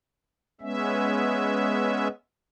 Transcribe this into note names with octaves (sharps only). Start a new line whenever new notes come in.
G#3 B3 C#4 E5